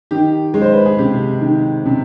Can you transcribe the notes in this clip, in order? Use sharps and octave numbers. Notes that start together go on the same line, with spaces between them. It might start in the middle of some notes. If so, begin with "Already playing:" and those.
D#3 G4
G#3
C5
B4
G#4
C3 G4
D#3
C3